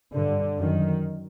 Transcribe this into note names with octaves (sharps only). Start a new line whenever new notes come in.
G2 D3
F#2 D#3